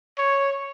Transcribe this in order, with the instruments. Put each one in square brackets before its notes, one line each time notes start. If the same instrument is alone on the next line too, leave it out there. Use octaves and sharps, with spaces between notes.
[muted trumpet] C#5